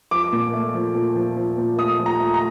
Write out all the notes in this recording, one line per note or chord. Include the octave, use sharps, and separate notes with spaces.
F3 D6
A#2
A3
F3
A#2
F3
F3
A#2
A3 D#6
F3
A#5
A3
A#5